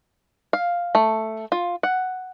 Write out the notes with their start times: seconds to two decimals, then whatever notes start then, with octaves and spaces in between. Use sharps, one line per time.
0.53 F5
0.95 A3
1.52 F4
1.83 F#5